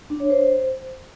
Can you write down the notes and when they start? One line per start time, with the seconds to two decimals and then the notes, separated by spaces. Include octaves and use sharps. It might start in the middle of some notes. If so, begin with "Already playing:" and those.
0.10 D4
0.20 C#5
0.30 C5